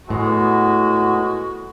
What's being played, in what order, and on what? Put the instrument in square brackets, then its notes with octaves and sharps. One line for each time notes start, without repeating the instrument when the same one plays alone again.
[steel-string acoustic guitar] A2 [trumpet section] G#3 B3 [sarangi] F#4